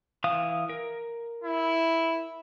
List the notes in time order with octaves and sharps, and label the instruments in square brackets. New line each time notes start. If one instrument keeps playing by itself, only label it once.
[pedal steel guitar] E3 F5 D#6
A#4
[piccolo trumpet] E4